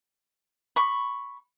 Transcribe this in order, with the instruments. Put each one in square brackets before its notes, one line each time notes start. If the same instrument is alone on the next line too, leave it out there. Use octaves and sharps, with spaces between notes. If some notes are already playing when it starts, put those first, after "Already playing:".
[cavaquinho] B5 C#6